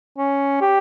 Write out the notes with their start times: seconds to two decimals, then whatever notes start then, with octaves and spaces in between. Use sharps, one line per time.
0.18 C#4
0.61 G4